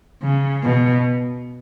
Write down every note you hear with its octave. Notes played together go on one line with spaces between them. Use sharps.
C#3
B2